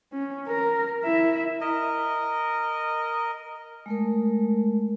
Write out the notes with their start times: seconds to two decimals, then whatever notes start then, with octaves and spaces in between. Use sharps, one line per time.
0.13 C#4
0.48 A#4
1.04 E4 E5
1.61 A#4 D#5
3.86 G#3 A3 A#4